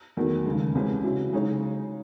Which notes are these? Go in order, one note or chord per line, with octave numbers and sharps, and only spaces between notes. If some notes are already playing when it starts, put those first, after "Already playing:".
E2 D#3 F#3 A3
D#2 C#3 G#3
C2 C3 E3 G#3 C#4
C#3 F#3 C#4 E4
C#3 G#3 D#4 G#4 C#5